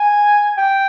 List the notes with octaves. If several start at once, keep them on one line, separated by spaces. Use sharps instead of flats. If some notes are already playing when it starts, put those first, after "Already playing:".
Already playing: G#5
G5